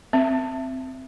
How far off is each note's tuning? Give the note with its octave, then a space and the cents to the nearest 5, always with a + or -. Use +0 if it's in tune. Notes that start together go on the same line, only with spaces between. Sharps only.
C4 -10 E5 +15